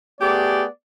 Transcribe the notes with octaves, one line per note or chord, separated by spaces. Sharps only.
A3 B3 G4 G#4 D5